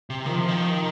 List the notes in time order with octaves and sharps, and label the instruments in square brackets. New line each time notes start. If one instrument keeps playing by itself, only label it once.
[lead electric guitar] C3
[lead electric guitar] D#3 [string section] F3
[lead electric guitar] C3
D#3